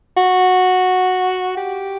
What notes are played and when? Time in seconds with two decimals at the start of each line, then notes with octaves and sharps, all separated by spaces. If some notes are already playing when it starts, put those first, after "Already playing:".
0.17 F#4
1.57 G4